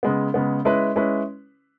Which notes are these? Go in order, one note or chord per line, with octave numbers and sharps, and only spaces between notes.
C#3 G#3 B3
C#3 G#3 B3
G#3 C#4 E4 B4
G#3 C#4 E4 B4